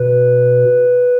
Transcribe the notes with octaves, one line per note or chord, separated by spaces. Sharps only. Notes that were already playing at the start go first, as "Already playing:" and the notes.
Already playing: B2 B4